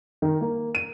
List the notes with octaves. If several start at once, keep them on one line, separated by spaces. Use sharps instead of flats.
D#3
A#3
D#7